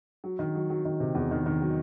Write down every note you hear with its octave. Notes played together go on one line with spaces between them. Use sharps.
F#3
D#3
F#3
F#3
D#3
C3
E2
D#3
D#3
F#3